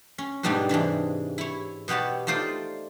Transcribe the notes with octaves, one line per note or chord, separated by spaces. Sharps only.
C#4
G#2 B2 G3 A3 D4 D#4
G#2 C3 E3 D4
E4 C#5
B2 B3 G4 C#5 A5
A3 D#4 F4 C5 D5